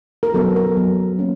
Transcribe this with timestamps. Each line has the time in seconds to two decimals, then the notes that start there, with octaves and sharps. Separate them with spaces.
0.23 A#4
0.34 F#3 B3 A4
0.56 A#4
0.77 F#3 B3
1.19 A#3 C#4